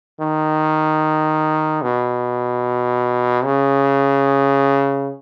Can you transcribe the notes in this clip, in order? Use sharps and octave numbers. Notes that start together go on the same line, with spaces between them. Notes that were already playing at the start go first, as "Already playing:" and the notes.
D#3
B2
C#3